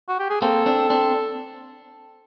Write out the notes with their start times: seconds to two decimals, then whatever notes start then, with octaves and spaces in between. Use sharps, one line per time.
0.08 F#4
0.19 G4
0.30 G#4
0.41 A#3 C4 A4
0.66 C4 D4
0.90 C4 D4